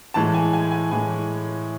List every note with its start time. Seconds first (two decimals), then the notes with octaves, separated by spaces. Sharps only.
0.14 A2 E3 G#3 A5
0.34 G#5
0.53 G#5
0.72 G#5
0.91 A2 E3 G#3 G#5